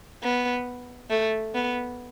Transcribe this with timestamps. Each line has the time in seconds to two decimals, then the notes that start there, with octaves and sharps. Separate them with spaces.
0.23 B3
1.10 A3
1.55 B3